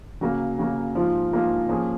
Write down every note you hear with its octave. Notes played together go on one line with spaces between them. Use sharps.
C#3 F#3 A#3
C#3 F#3 A#3
G#2 F3 A#3 F4
G#2 F3 A#3 F4
F3 A#3 C#4 G#4